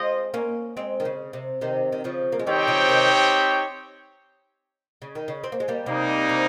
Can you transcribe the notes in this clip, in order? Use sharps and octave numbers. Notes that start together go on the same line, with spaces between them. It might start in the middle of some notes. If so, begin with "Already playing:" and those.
Already playing: G#3 C4 F4 C5 D#5
A#3 C#4
G#3 C4
D#3
C#3
C3
C3 D#3
D#3
C#3 F3
A#3
G#3
D#3 G3 C4 D#4 G4 C#5 G5
C#3 F3
C3 D#3
C#3
D#3
C#3
C4
A#3
G#3
G3 A#3
C3 G3 A#3 D#4
C3